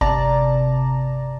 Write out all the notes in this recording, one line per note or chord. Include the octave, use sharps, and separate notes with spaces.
G1 C3 D5 A5 A#5